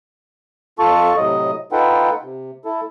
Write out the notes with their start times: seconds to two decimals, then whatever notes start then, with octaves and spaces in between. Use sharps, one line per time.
0.79 F2 F4 A4 A5 C#6
1.16 A2 C3 F#3 D#5
1.72 D#4 F4 A4 B4 F#5 G5
2.22 C3
2.65 E4 A4